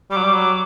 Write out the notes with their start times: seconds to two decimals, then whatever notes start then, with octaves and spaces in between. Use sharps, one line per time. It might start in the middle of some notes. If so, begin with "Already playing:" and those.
0.11 G3 D6
0.17 F#3
0.24 G3
0.34 F#3